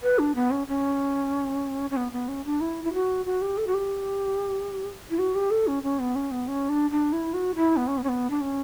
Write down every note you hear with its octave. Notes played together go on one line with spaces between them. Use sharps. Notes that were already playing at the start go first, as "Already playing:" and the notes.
B4
D4
B3
C#4
C#4
C#4
B3
B3
C#4
D4
E4
E4
F#4
F#4
G4
A4
F#4
G4
E4
F#4
G4
A4
C#4
C#4
B3
C#4
B3
C#4
D4
D4
E4
F#4
E4
B3
C#4
B3
C#4
B3
D4
C#4